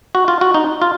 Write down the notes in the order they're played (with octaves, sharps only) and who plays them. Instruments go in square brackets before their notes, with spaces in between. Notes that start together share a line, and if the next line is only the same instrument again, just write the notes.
[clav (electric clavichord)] F#4
F4
F#4
D#4
F4